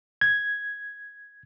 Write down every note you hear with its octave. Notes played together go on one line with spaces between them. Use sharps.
G#6